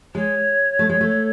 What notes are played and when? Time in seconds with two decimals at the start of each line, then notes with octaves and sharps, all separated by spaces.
0.15 G#3 C#5
0.79 A3
0.89 G#3
1.01 A3